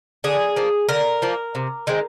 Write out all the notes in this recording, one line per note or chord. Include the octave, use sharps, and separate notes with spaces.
D3 G#4
F3 A#3
D3 A#4
F3 A#3
C3
D#3 G#3 C4